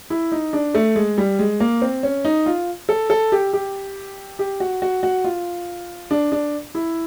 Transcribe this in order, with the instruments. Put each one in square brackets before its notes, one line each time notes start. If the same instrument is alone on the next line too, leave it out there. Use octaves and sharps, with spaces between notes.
[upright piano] E4
D#4
D4
A3
G#3
G3
G#3
A#3
C4
C#4
D#4
F4
A4
A4
G4
G4
G4
F#4
F#4
F#4
F4
D4
D4
E4